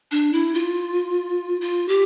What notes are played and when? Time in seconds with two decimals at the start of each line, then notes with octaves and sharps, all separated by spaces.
0.11 D4
0.33 E4
0.54 F4
1.61 F4
1.88 G4